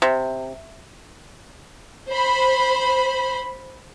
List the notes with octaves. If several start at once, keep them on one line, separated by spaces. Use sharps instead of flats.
C3
C5 B5